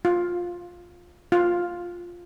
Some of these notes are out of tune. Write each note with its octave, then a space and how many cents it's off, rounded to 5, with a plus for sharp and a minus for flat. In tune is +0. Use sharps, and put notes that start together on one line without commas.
F4 +10
F4 +5